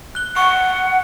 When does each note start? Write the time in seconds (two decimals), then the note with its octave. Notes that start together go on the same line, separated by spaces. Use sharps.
0.15 F#6 G7
0.36 F#5 C#6